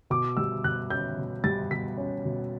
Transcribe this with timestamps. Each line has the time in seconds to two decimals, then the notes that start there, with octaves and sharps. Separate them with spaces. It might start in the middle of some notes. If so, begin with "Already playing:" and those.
0.10 B2 D6
0.37 G3 E6
0.64 B2 F#6
0.90 C#4 G6
1.18 B2
1.44 G3 A6
1.71 B2 B6
1.97 C#4
2.25 B2